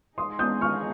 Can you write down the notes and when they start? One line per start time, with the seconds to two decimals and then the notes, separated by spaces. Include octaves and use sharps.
0.18 G#3 D#4 G#4 C6 D#6
0.39 D#6 G6
0.61 C#6 F6